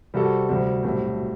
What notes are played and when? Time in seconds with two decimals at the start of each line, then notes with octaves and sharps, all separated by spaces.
0.14 C3 G3 C4 F#4 A4
0.49 D2 C3 G3 C4
0.83 B1 A2 G3 C4